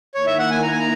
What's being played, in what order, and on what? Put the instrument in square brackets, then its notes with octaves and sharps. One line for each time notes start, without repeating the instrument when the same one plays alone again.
[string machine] D#3 A#3 E4 [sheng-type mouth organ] C#5
[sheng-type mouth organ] E5
F#5
G#5
A#5
G#5
A#5